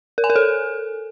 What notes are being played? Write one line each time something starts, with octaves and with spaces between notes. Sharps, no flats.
A#4
G#5
A#4
A4